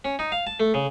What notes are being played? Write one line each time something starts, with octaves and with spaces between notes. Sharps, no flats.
C#4
D#4
F5
A5
A3
C#3